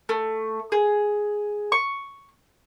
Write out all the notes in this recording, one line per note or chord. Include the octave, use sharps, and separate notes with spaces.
A3
G#4
C#6